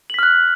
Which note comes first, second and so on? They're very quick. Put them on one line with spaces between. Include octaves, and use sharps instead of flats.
F#7 B6 F6 F#6